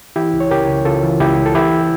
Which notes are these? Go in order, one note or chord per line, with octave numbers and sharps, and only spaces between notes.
E3 E4 G4
C#2
C#5
C#3 G4 A#4
C#2
C#3 F4 A4
E3
C#2 E4 G4
C#2
A4
E3 E4 G4
E3